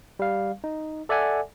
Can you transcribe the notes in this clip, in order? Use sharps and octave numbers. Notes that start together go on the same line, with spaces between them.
G3 F5
D#4
A4 D5 E5 F#5 G#5